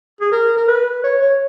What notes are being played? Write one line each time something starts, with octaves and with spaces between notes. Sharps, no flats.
G#4
A#4
A#4
B4
C#5
C#5